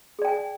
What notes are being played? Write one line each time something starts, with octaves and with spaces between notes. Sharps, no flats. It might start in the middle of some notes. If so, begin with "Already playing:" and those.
G#4 D5 G5 G#5